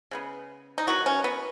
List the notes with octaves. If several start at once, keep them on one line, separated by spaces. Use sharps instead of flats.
C#3 G#3 B3
D#4
D#3 F#3 B3 F#4
C#4
B3